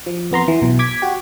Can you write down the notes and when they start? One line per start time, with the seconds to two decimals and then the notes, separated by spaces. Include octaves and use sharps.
0.06 F3
0.31 F2 B3 A#5 C6
0.48 E3
0.62 B1 B2
0.79 D6 G#6 B6
1.02 F#4 G4